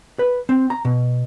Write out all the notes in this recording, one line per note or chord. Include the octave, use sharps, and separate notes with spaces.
B4
C4
A#5
B2